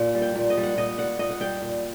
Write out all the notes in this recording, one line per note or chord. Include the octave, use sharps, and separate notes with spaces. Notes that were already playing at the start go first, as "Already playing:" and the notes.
Already playing: A#2
G3
G5
A#2
D#5
G3
F#5
A#2 D#5
G3 F#5
A#2 D#5
F#5
G3 G5
A#2